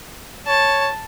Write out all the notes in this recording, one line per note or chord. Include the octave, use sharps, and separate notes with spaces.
C#5 A5